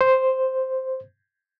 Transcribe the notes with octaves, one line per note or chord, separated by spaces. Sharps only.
C5